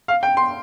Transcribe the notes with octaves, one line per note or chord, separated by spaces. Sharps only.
F5
G5
C6